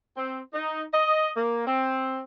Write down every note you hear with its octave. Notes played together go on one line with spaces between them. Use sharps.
C4
D#4
D#5
A#3
C4